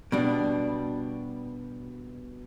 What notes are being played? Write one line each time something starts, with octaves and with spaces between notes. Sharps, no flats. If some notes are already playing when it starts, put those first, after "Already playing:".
B2 G3 D4